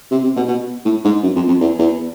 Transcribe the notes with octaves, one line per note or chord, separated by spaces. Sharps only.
C3
C3
B2
B2
A2
G#2
F#2
F2
F2
E2
E2